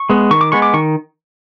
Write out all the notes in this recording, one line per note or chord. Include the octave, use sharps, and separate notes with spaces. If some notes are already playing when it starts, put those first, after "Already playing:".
Already playing: C#6
G#3 B3
D#3 C#6
D6
G#3 B3 C#6
D6
D#3 C#6